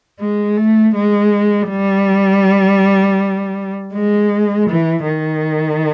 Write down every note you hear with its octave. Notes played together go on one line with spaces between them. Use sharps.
G#3
A3
G#3
G3
G#3
E3
D#3